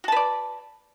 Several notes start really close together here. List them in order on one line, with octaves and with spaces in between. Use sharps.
F#4 A5 B4 D5